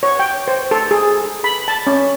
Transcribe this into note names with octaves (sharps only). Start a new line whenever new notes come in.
C#5
G5
C5
A4
G#4
B5
A5
C#4